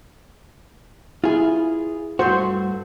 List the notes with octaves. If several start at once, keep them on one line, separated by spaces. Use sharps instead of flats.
E4 F4 G#4
G2 A3 F#4 C5